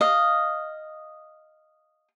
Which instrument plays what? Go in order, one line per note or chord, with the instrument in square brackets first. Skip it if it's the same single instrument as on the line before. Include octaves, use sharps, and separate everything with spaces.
[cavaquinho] D#5 F5